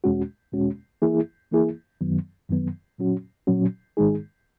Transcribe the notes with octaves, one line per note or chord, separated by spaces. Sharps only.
E2 B2 G#3 C#4 F#4
E2 B2 G#3 C#4 F#4
E3 A#3 E4 G#4
E3 A#3 E4 G#4
F#2 D#3 F#3 B3
F#2 D#3 F#3 B3
A#2 F#3 C#4 F#4
A#2 F#3 C#4 F#4
G#2 D#3 G#3 D#4 G#4